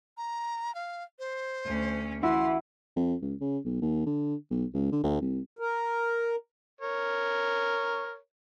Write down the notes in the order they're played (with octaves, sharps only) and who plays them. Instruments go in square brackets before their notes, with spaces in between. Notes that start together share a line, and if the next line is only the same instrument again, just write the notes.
[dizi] A#5
F5
C5
[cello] D2 C#4
[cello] E3 [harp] E4 F#4 [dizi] C6
[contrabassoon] F2
C#2
C#3
B1
D#2
D3
B1
C#2
D3
D2
C2
[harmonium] A#4
[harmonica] A#4 C#5